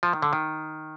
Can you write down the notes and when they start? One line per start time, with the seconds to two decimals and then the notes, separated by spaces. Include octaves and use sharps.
0.03 F3
0.13 D#3
0.22 D3
0.33 D#3